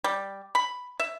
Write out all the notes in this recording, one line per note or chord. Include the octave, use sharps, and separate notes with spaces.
G3
B5
E5